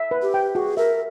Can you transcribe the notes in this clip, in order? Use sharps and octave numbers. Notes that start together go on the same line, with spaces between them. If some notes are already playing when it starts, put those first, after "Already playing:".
Already playing: E5
B4
G4
G5
F#4 G#4
A#4 E5